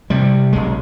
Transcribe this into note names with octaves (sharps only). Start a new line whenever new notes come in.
C3 G3
B1 G#3